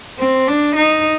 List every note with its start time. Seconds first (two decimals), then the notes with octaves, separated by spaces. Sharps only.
0.19 C4
0.48 D4
0.75 D#4